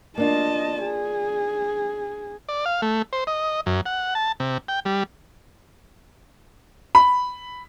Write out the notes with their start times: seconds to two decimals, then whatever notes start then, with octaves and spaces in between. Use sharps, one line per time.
0.18 A#3 D4 F4 D#5 A5
0.82 G#4
2.49 D5
2.66 F5
2.82 A3
3.13 C5
3.27 D#5
3.66 F#2
3.86 F#5
4.15 A5
4.40 C3
4.68 G5
4.85 G3
6.95 B5